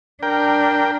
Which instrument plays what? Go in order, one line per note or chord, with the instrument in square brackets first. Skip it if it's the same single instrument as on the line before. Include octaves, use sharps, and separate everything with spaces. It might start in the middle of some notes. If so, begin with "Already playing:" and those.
[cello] D4 [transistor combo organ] A#4 G5